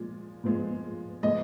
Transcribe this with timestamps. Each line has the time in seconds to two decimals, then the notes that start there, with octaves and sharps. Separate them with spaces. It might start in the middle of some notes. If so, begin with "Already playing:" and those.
Already playing: A#2 F3 G#3
0.44 A#2 F3 G#3
1.23 A#2 F3 G#3 D#5